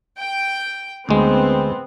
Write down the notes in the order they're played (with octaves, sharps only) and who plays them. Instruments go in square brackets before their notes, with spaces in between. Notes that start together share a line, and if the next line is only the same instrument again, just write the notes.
[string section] G5
[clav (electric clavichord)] D2 G#3 [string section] B3 C4